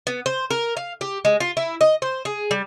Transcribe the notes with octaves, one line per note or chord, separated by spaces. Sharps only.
B3
C5
A#4
F5
G4
G#3
F4
E4
D#5
C5
G#4
G3